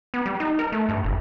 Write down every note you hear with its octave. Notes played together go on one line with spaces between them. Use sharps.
B3
G3
D#4
A#4
A3
G2
F#1